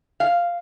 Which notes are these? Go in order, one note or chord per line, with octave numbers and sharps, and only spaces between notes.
F5